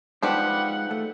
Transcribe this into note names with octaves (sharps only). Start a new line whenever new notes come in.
F3 G3 G#3 B3 D#4 G4 F#5
A3